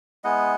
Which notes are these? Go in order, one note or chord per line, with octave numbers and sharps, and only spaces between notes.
G#3 B3 E4 D#5 F#5